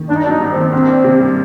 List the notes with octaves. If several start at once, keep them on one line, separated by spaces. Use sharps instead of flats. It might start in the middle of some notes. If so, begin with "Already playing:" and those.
Already playing: D#3
G1 D4
D#4
F#3 D4
D#4
G2
D#3 C4
C2 C4
D4
C3
G3